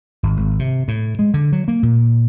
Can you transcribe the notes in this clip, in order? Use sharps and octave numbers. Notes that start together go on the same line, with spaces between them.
G#1
G#1
C3
A2
G#3
D3
F#3
A#3
A#2